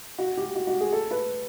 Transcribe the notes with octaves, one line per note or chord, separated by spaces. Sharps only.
F#4
G4
F#4
F#4
G#4
A4
B4